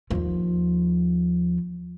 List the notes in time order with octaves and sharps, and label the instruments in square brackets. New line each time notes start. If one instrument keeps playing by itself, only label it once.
[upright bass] D#2 F3